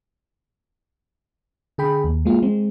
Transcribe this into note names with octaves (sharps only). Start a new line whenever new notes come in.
D3 G#4 G5 B5
D#2
G#3 A#3 F4
G#3 C4